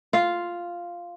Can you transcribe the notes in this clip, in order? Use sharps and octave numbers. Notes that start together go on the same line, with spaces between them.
F4 F5